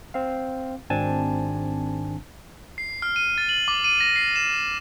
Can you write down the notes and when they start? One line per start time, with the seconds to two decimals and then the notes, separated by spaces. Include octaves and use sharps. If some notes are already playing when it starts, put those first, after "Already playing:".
0.14 C4 F5
0.90 G#1 C4 D4 G#5 A5
2.78 C7
3.02 F6
3.16 D#7
3.38 A6
3.49 F#7
3.68 D6
3.84 D#7
4.01 A#6
4.16 C7
4.36 E7